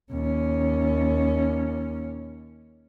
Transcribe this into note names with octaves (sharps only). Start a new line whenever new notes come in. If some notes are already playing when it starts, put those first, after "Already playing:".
D#2 C#4